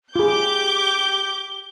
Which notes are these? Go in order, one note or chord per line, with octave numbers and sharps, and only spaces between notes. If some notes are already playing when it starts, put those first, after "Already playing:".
F4 G4 G#4 D6 G6 G7